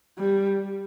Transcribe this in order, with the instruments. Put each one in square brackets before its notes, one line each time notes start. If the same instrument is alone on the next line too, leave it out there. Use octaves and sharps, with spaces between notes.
[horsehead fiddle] G3